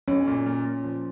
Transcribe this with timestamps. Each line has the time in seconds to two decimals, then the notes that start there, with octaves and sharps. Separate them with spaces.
0.08 B1 C#4
0.27 A#2
0.46 A#2
0.65 A#2
0.84 F3